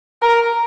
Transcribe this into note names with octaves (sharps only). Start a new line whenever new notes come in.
A#4